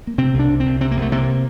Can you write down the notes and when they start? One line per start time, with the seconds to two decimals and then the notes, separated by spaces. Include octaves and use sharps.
0.07 A#3
0.18 C3 C4
0.34 C2
0.39 D4
0.49 C3
0.60 C4
0.65 C2
0.81 C3 C4
0.91 A#3
0.97 C2 A3
1.12 C3 A#3